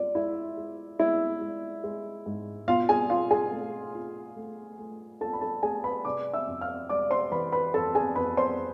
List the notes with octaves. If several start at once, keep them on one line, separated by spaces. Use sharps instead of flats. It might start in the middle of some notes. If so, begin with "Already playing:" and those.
Already playing: G#3 F4 D5
G#3 E4 E5
G#3
G#3 E4 E5
G#3
G#3
G#2
B2 F4 F5
G#4 G#5
F4 F5
G#4 G#5
A3
F4
A3
A3
F4 A4 A5
B5
A4 A5
A3 G#4 G#5
B4 B5
C3 D5 D6
E5 E6
F2
F5 F6
G#3 D5 D6
C5 C6
E3 B4 B5
B4 B5
F2 A4 A5
G#4 G#5
F2 B4 B5
C5 C6